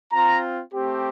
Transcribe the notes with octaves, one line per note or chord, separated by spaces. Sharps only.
C4 F4 A#5
A3 C4 G4